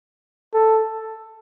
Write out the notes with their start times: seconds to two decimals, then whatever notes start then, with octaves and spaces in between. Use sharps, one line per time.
0.54 A4